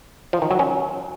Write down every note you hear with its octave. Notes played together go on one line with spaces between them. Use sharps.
F3
D#3
F#3
C#4